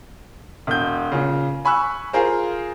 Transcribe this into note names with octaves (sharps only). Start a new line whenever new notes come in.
E1 G6
A#2 C#3
G#5 B5 C#6 E6 F#6
F4 G#4 A#4 C5